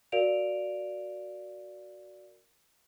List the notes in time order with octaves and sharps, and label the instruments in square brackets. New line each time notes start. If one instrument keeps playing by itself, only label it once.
[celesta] F#4 A#4 D5 F5 D7 F7